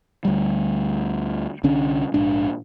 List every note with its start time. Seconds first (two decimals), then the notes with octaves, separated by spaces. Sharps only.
0.25 D2 G3
1.63 C2 D3 C#4 D4
2.14 A#1 G#2 D4